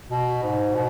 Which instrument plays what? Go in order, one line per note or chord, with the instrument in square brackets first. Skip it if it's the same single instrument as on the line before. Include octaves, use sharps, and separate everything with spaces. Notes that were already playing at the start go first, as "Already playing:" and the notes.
[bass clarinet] B2
G#2
B2